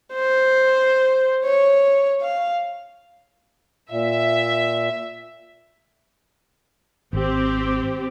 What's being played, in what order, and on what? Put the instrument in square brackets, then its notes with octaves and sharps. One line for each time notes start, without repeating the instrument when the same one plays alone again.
[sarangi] C5
C#5
F5
[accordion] A#2 [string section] E5
[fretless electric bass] G#1 [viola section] C4 G4